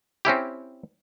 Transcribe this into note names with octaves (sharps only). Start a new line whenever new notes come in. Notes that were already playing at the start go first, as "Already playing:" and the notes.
C4 C#4 E4 G4